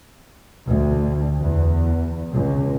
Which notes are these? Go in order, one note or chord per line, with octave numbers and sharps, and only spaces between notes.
D2
E2
C#2